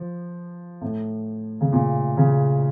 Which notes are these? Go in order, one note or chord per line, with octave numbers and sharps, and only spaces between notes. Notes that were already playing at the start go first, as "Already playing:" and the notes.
Already playing: F3
A2
C#3
A#2
C#3